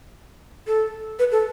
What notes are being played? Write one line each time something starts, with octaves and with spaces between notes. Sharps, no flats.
A4
B4
A4